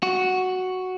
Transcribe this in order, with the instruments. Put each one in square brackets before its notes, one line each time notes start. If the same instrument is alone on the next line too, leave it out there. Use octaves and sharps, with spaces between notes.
[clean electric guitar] F#4